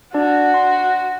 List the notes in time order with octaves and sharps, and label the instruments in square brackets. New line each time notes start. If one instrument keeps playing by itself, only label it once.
[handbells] D4 D5 A5 [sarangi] F#4
[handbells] C6